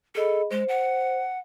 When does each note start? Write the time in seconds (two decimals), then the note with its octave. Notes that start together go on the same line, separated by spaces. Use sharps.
0.15 G#4 A4 D#5 B5
0.51 G#3 C5
0.68 F#5